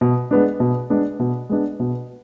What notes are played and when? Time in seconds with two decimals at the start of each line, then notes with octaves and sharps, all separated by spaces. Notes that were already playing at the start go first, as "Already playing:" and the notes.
0.01 B2
0.31 G#3 B3 D4
0.60 B2
0.90 G#3 B3 D4
1.20 B2
1.49 G#3 B3 D4
1.80 B2